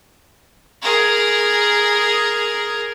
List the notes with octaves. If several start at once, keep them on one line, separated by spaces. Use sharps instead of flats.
G#4 A#4